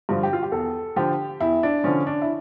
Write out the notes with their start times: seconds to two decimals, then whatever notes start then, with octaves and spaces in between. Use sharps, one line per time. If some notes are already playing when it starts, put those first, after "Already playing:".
0.09 G2 D3 F3
0.23 G4
0.33 F4
0.43 G4
0.52 E2 A4
0.96 D3 F3 G4
1.41 E2 E4
1.63 D4
1.84 D3 F3 C#4
2.07 D4
2.22 E4